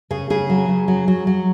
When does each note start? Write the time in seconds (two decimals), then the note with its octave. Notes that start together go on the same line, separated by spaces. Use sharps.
0.10 C#3 G#4
0.30 C#3 G#4
0.50 F#3
0.68 C#3
0.88 F#3
1.08 F#3
1.27 F#3